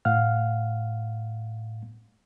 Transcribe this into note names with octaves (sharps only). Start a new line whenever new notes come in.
A2 F5 F#5 F6